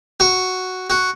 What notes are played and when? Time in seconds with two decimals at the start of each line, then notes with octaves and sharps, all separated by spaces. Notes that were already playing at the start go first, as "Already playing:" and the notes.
0.20 F#4
0.90 F#4